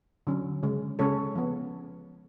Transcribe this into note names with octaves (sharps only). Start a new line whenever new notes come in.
D3 F#3 C#4
C#3 G#3 C#4
C#3 G#3 C#4 A4 C#5
F3 B3